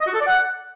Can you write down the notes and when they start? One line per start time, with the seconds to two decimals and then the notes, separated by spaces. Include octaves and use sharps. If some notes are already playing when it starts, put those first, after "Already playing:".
0.01 D#5
0.08 F#4
0.14 A4
0.21 D5
0.27 F#5